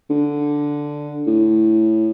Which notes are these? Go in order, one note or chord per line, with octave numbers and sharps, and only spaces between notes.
D3
A2